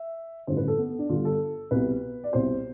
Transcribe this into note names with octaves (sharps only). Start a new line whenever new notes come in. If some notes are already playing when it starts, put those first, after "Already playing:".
Already playing: E5
A1 G2 D3 C5
B4
A4
B3
B3
D4
G1 G2 D3 F4
A4
C2 B2 B4
D5
C2 B2 C5